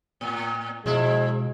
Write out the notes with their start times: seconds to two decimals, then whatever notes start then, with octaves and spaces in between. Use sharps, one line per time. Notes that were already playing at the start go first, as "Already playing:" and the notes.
0.21 A2
0.86 B2 F3 G#3 E4